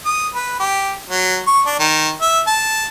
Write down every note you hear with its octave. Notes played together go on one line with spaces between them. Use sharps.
D#6
B4
G4
F#3
C#6
D4
D#3
E5
A5